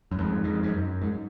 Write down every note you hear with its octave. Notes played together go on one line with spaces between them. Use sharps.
F#2
F2 G#2
F2 G#2
G#2
F#2
G#2